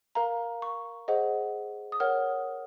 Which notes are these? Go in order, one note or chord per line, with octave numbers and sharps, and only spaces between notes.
A#4 F5 A#5
C#6
G#4 C5 D#5 F#5
D#6
A#4 C#5 F#5 F6